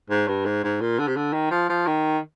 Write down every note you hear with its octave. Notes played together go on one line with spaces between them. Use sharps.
G#2
G2
G#2
G#2
A#2
D3
C3
D3
D#3
F3
F3
D#3